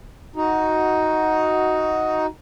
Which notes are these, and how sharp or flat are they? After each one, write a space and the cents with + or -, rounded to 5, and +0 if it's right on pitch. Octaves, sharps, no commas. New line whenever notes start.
D#4 +10 F#4 +0